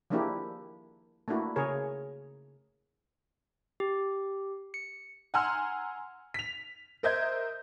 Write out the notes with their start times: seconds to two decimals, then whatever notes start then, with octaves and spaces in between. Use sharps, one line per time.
0.10 F3 G#3 A#3 D4 E4 G4
1.28 A3 A#3 D4 E4 F#4
1.56 C#3 G#4 A#4 C#5
3.80 G4
4.74 C#7
5.34 F#5 G#5 A#5 C6 E6 F6
6.34 B6 F7
7.03 A#4 C5 D#5 E5 G6 G#6